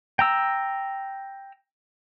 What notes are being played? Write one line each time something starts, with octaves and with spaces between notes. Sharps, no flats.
G5 A#5 E6